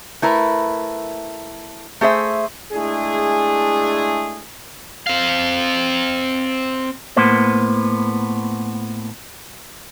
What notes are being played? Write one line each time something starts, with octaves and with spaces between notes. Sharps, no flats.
A3 E4 A#4 B4
A3 G#4 C5 E5
G#3 A3 D4 E4 G#4
C4 F5
A2 A#3 B3 C5